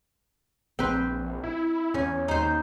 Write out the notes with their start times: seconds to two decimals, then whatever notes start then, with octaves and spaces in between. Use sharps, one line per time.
0.79 A#1 C4 B4
1.44 E4
1.94 E2 C#4 C#5
2.28 D#2 D#4 C5